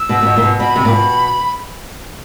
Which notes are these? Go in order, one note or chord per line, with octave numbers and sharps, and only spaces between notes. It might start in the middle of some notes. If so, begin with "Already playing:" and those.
Already playing: E6
B2
A#2
B2
A#2
B2
B2 B5
C3
A#2
B2